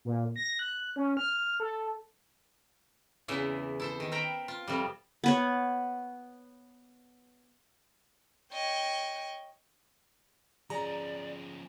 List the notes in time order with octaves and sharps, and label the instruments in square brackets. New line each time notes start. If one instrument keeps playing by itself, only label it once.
[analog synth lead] A#2
A#6
F#6
C#4
F6
A4
[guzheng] E2 C#3 E3 E5
E4 A4 C5
D#3
A#4 C5 E5 G5 A#5 B5
F4
F2 C3 G3
[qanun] B3 B4 C#5
[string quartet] C#5 D#5 G5
[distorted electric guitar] F3 C#4 [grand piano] G#4 [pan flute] D5 [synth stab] A#5